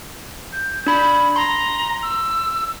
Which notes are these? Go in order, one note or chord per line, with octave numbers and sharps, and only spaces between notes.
G6
D4 B5
A#5 C6
E6